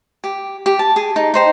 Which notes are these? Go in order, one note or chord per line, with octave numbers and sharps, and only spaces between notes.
G4
G4
A5
G#4
D#4
D#4 C5 G5